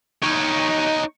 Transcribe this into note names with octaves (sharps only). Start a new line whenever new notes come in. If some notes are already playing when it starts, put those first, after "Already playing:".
D#4 C#5